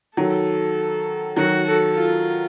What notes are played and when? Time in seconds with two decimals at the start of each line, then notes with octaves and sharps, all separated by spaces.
0.17 D#3 F#3 A4
1.37 D#3 F#3 F#4
1.66 A4
1.96 F4